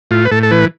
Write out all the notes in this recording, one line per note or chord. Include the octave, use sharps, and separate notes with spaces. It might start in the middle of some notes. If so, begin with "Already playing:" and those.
A2 F4
B4
A2 A4
A4
E3 B4